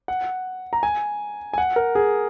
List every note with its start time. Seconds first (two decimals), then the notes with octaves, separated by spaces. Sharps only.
0.08 F#5
0.73 A#5
0.83 G#5
1.53 G#5
1.58 F#5
1.76 A#4
1.95 G#4